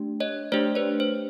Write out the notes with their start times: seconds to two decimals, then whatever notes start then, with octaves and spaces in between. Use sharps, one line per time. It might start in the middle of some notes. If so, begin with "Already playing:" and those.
Already playing: A3 D4 G4
0.20 C#5 D#5
0.52 A3 D4 G4 C5 D5
0.75 B4 C#5
1.00 C5